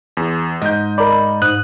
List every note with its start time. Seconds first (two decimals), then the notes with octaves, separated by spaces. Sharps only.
0.17 E2
0.62 G#2 D#5 G6
0.98 A#4 D5 B5
1.42 G#2 D#6 F#6